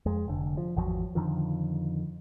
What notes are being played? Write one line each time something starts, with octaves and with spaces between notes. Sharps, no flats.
F2 G#3
F1 D3
F3
G#1 E2 F3 F#3
F2 D3 D#3 F3